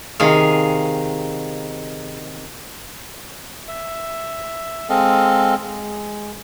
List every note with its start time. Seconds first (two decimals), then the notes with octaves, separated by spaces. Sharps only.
0.20 C3 D#3 G#4 F5
3.68 E5
4.89 G#3 C4 A4 D#5 F5
5.61 G#3